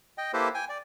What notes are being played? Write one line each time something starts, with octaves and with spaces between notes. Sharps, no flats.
D#5 G5
A#3 E4 G4 A4 B4 C5
G5 G#5
D5